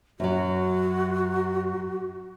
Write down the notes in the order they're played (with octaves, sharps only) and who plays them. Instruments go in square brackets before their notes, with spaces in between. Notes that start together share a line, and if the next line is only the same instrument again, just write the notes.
[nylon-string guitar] F#2 F#3 [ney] F#4